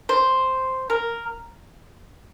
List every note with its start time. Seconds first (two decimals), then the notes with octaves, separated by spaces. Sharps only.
0.09 C5
0.90 A#4